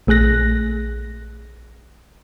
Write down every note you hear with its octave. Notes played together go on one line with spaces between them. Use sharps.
A#1 A3 G#4 F#6 A#6